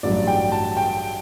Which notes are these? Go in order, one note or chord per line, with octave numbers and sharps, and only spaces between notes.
A1 G2 F#3 D5
G5
A5
G5